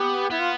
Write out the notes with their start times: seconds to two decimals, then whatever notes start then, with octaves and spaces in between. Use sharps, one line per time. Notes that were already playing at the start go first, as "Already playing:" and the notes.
Already playing: B3 G4
0.30 B3 E4
0.39 F4